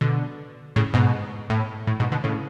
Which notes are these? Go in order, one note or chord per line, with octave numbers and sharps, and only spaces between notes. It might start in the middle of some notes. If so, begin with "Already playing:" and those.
B2 D3
A2 C#3
G#2 B2
A2
A2
G#2 B2
B2 D3
A2 C#3